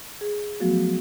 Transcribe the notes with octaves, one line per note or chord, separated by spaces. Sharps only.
G#4
F3 F#3 A3 B3 F#4